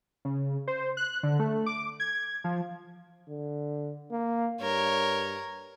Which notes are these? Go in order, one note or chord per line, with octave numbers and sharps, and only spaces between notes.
C#3
C5
F#6
D3
A3
D6
G#6
F3
D3
A#3
G2 A#4 C#5